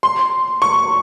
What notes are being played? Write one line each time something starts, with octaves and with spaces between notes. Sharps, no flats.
C6
C#6